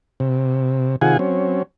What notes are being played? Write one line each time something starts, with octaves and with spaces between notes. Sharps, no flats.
C3
C3 D#3 F4 G#4 F#5 G#5
F#3 C4 C#4